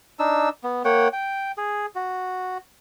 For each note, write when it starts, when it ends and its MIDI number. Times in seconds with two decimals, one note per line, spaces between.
0.19 0.49 62
0.19 0.49 63
0.19 0.49 88
0.64 0.82 59
0.85 1.08 58
0.85 1.08 73
0.85 1.08 78
0.85 1.08 79
1.13 1.52 79
1.57 1.86 68
1.95 2.58 66